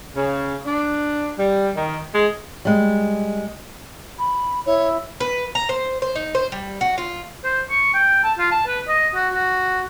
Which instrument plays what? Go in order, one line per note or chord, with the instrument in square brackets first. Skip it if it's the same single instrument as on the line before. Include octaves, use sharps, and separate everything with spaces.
[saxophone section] C#3
D4
G3
D#3
G#3
[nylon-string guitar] G3 G#3
[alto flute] B5
[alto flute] E4 [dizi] C#5
[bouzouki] B4
A#5
C5
C5
D#4
C5
G3
F#4
F4
[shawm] C5
C#6
G5
A5
F4
A5
B4
D#5
F#4
F#4